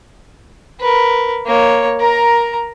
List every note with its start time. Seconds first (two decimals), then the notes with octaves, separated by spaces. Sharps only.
0.80 A#4 B4
1.46 A#3 C#5
2.00 A#4 A#5